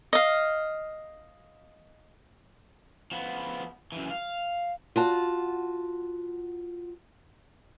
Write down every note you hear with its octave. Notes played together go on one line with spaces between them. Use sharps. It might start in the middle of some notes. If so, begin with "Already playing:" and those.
D#5 F5
F3 B3
F#2 E3
F5
F4 F#4 A5